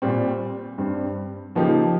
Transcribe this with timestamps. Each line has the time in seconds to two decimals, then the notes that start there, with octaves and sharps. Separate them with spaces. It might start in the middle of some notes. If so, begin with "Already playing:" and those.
0.02 A#2 G3 C4
0.78 G2 G3 C4
1.55 C#3 F3 A#3 D#4 G4